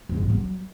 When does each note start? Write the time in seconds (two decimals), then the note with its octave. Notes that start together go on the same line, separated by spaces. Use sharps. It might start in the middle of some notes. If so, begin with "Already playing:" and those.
0.09 F2
0.16 G#2
0.23 F3
0.30 F#3